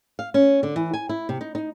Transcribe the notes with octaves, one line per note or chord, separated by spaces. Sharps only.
F5
C#4
D3
E3
G#5
E4
C3
D#4
D#4